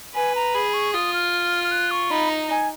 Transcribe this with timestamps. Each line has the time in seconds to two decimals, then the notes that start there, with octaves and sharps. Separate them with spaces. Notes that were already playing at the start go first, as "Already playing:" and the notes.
0.15 B4 G#5
0.35 A#5
0.55 G#4 B5
0.74 C#6
0.93 F4 D#6
1.14 F6
1.64 F6
1.71 F#6
1.91 C#6
2.10 D#4 B5
2.30 A#5
2.50 G#5